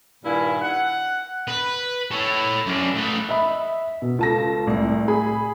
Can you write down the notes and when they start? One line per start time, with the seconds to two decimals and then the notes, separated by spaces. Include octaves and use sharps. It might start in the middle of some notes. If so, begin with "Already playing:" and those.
0.23 G2 A#2 D#3 E4 G#5
0.62 F#5
1.48 B4
2.11 A4 C#5
2.67 F#2 D4
2.96 A3 B4
3.29 D#5 E5 B5
4.02 B2
4.19 C#2 F4 A4 A5 A#6
4.67 C2 A2
5.08 G#4 B5